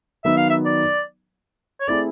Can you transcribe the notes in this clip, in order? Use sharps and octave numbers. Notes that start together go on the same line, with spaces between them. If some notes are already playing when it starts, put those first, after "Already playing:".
D#3 F#3 B3 D#4 E5
F5
E5
D5
C#5
A3 C4 E4 G#4 D5